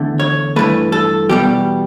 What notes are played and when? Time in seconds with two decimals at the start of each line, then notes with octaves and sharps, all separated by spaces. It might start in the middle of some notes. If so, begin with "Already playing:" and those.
Already playing: E2 D3 A3
0.20 C#5
0.56 G2 E3 A3 B4
0.92 A4
1.29 E2 B2 G3 G4